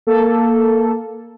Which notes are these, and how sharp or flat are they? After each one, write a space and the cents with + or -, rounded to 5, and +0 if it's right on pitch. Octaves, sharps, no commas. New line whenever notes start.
A#3 +0 A4 +0